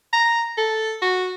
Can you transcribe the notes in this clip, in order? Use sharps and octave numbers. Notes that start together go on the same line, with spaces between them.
A#5
A4
F#4